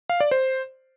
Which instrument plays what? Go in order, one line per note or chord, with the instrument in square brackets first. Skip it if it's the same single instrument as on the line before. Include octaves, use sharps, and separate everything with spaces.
[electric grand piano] F5
D5
C5